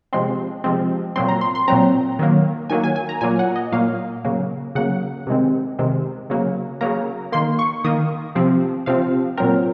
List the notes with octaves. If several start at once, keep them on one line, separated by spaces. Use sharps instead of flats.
C3 F3 G#3 C4 C6
C3 F3 G#3 C4
A#2 F#3 C4 C6
A#5
C6
C6
A#2 F#3 C4 A#5
D#3 F#3 A#3
D#3 F#3 A#3 G#5
G#5
G#5
A#5
A#2 F#3 A#3 G#5
F#5
D#5
A#2 F#3 A#3 F5
C#3 F#3 A#3
C#3 F#3 A#3 F#5
C3 D#3 G#3 C4
C3 D#3 G#3 C4
C#3 F#3 A#3
C#3 F#3 A#3 A#5
D#3 A#3 C6
C#6
D#3 A#3 D#6
C3 F3 C4
C3 F3 C4 F5
A#2 F#3 C4 A#4